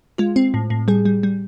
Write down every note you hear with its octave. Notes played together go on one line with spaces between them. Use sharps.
G#3 F4
C4
A2
A2
G3 G#4
G3
G3